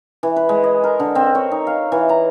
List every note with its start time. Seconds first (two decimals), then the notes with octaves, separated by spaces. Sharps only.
0.23 E3
0.36 B4
0.49 G#3
0.64 D#5
0.84 A#4
1.00 D3
1.15 C4
1.35 C#5
1.52 D#4
1.67 F5
1.92 E3
2.09 A#5